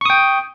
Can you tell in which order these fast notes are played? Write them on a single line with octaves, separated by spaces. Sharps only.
C#6 D#6 G5